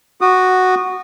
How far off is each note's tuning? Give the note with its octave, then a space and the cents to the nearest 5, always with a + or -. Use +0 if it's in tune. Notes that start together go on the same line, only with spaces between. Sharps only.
F#4 +0 D#6 -30